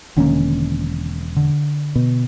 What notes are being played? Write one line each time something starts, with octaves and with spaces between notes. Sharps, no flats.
E1 D3 D#3 A#3 C#4
D3
B2